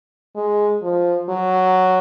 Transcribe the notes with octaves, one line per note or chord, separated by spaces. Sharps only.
G#3
F3
F#3